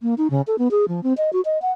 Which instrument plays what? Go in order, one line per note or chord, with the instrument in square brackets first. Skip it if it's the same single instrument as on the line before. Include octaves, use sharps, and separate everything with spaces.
[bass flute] A#3
D#4
C#3
A4
B3
G#4
F3
C4
D#5
F#4
D#5
F#5